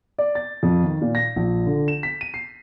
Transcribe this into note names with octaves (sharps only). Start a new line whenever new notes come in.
D5
A6
F2
D#3
A#2
A#6
A#1
D3
E7
B6
D#7
C7